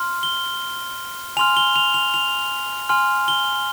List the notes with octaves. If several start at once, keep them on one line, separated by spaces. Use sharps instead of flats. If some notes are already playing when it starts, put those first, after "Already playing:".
Already playing: C6 F6
G7
G#5 C6 F6 F7
G7
F7
F7
F7
G#5 C6 F6
G7